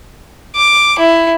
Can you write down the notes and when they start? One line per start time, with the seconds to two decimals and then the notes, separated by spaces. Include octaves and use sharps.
0.56 D6
0.98 E4